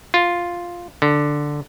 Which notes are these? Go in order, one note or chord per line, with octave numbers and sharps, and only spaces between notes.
F4
D3